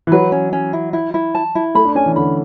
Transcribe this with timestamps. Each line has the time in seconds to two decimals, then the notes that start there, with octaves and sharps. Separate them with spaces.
0.07 E3
0.12 F#3 B4
0.32 C#4
0.53 C#4
0.73 E4
0.93 E4
1.14 E4
1.35 A5
1.55 E4
1.75 A3 B5
1.85 D4
1.95 C#4 G#5
2.06 E3
2.16 D3 B5